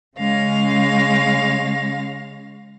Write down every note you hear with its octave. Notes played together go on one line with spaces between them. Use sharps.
C#3 G#3 C#4 F5 A#6